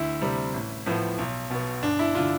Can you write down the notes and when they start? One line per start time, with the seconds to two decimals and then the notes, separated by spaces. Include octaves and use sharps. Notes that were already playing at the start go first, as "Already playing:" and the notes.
Already playing: D2 E4
0.21 C3 G3 C4
0.54 A1
0.86 A2 F3 B3
1.18 B1
1.50 B2 B3
1.83 G1 D4
1.99 E4
2.15 D3 D4 F4